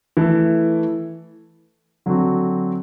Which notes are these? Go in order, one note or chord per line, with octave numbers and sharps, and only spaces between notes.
E3 A3 E4 A4
D3 F#3 C4 F#4